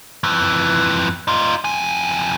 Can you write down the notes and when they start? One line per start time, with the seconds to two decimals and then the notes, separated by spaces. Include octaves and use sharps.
0.24 F2 E3
1.28 D#4 F4
1.65 F2 G#5